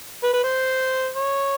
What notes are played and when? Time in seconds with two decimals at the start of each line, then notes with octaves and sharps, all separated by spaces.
0.23 B4
0.33 B4
0.44 C5
1.15 C#5